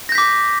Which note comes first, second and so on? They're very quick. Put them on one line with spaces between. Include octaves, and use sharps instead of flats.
A#6 G6 B6 D6